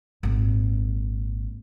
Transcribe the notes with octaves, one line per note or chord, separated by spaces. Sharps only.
G#1 A#2